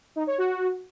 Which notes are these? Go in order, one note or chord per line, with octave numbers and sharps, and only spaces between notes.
D#4
C#5
F#4